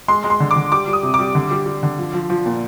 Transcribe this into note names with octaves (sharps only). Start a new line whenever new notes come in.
G#3 C6
G#3
C6
D3
D6
D3
G3 D6
G3
D#6
C3
D6
G3
D3
G3
G3
D3
F3
F3
F3
A#2